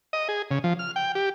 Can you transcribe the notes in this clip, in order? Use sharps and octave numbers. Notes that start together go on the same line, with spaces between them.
D#5
G#4
C#3
F3
F6
G5
G4